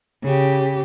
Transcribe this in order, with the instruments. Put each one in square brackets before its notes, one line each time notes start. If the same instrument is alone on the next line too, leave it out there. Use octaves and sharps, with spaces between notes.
[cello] C#3 G4